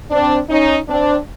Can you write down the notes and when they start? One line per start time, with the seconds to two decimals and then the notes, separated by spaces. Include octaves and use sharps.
0.11 C4 D4
0.50 C#4 D#4
0.89 C4 D4